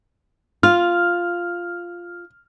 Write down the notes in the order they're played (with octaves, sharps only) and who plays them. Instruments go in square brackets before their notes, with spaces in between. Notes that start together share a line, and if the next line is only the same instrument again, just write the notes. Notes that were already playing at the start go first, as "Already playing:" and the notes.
[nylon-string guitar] F4 [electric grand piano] F6